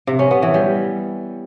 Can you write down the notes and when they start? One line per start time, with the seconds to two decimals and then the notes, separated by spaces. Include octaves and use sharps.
0.07 C3
0.19 C#4
0.31 B3
0.42 E3
0.54 G3